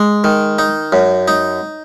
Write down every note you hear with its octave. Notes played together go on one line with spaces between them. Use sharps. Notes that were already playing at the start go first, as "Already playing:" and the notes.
Already playing: G#3
D#3
D#4
F#2
D#4